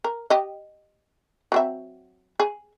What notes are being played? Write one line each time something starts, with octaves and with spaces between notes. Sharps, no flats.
A#4
G4 D#5
F#3 C4 E5
G#4